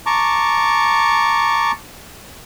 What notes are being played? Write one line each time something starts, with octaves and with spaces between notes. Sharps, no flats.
A5 A#5 C#6 D6